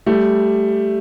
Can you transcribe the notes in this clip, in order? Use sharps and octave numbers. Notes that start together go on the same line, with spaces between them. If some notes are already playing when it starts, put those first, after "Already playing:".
G3 A3